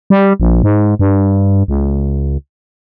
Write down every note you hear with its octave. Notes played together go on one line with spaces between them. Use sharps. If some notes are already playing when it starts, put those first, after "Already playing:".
G3
A#1
G#2
G2
C#2